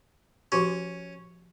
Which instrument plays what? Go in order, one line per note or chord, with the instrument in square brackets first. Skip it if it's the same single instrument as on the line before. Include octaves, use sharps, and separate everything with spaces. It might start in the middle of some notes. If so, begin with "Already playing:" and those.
[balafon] F3 F#4 G4 [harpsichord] C#4